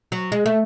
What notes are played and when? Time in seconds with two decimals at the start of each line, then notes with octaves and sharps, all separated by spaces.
0.12 F#3
0.32 G#3
0.46 A3